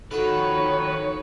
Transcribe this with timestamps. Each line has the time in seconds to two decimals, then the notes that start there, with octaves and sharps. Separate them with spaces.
0.11 D#3 F3 F#4 A4 B4 C#5